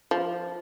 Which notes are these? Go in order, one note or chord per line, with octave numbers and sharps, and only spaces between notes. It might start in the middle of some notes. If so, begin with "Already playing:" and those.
F3